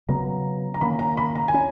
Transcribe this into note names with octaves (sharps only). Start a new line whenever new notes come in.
C#3 F#3 B3 A#5
A#5
D#3 A#3 C#4 B5
A#5
B5
A#5
G#5
C#4